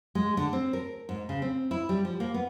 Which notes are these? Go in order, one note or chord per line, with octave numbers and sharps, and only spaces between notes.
G#3
D3
C4
A#4
G#2
C#3
C4
E4
G3
F3
A#3
B3